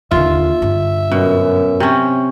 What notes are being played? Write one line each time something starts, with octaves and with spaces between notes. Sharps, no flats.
D#2 D3 F4 E5
G2 D3
F#2 B2
C3 C#4